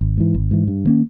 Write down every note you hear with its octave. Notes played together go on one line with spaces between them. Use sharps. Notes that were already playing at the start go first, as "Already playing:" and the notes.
G#1
G#2 E3
G#1
G#2 E3
G2
D#3 A#3 C#4